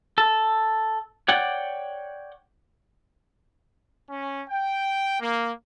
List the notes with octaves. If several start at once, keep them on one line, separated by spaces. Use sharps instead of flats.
A4
C#5 D5 F#5 G5
C#4
G5
A#3